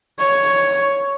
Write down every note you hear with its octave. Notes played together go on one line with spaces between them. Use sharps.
C#5